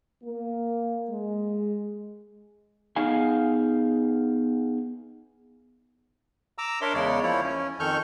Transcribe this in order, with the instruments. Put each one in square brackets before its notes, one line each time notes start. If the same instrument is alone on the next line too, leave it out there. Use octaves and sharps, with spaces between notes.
[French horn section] A#3
G#3
[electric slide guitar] B3 D#4 G#4 F5 G#5
[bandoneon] A#5 D6 E6
D4 A#4 C#5 E5 C6
E2 C#3 G#3 C#5 D5
F3 A#3 E4 C#5
C#4
F2 D#3 A4 C#6 F6 G6